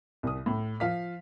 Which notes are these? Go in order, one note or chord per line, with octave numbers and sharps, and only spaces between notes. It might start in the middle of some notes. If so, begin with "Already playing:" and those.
C2 D#6
A2
F3 F5 B6